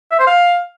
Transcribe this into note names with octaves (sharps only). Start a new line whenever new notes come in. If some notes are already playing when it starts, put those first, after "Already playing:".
E5
C5
F5